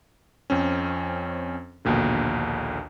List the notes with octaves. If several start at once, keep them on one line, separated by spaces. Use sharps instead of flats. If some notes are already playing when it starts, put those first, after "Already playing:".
F2 C4 C#4
A#1 D#2 B2 D3